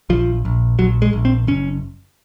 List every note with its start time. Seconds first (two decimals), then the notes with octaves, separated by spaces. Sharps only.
0.09 A#1 F3
0.45 A#1
0.79 A#1 F#3
1.02 G#3
1.13 A#1
1.25 C4
1.47 F#1 C#4